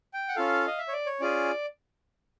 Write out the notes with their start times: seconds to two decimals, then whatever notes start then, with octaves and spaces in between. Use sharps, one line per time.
0.14 G5
0.29 F#5
0.36 C#4 F4 A4 F5
0.67 D#5
0.78 E5
0.88 C#5
0.93 D5
1.06 C#5
1.20 C#4 F4 G#4 D5